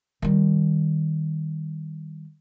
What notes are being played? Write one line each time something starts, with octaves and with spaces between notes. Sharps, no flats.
D#3 G3